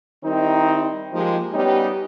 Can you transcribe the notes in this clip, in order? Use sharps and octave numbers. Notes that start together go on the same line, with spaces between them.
D#3 G3 C4 D#4 E4
F3 G#3 A#3 D#4 G4
G3 B3 C#4 D#4 G4